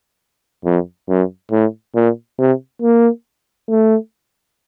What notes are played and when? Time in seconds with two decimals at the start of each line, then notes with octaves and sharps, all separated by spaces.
0.65 F2
1.09 F#2
1.52 A2
1.96 A#2
2.39 C3
2.82 A#3
3.69 A3